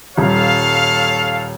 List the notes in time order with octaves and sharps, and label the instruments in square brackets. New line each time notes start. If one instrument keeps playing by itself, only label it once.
[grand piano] D#1 [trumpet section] A4 C#5 F5